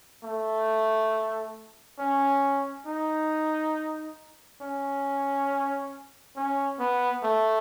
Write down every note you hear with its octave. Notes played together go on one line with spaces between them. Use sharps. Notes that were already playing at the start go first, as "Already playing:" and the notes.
A3
C#4
D#4
C#4
C#4
B3
A3